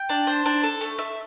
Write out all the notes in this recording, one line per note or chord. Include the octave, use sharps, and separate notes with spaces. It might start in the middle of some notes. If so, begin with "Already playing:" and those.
Already playing: G5
D4
C5
D4
A4
A3
E5